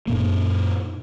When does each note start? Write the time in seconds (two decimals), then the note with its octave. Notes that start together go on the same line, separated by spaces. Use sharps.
0.07 F#2 A#2 A#3